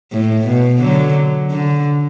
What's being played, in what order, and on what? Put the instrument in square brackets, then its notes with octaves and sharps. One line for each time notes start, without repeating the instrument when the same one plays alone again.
[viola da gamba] A2
B2
D3 F#3
D3